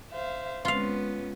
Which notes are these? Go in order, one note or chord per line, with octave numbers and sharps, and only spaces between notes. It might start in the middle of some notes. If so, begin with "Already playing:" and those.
C5 E5 F5
G#3 B3 C#4 F4 F5